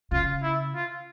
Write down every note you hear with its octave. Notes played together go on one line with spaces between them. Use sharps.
C#3 F4
E4
F4